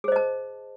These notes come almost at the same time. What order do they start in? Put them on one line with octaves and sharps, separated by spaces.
G#4 C5 D#5 A5